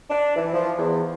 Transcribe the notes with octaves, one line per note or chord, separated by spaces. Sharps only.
D4
E3
F3
E2